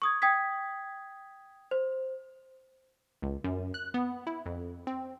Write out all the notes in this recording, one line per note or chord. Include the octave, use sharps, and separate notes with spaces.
C#6 D#6 G#6
G5 D#6 G#6 B6
C5
C#2
F#2
F#6
B3
E4
F2
C4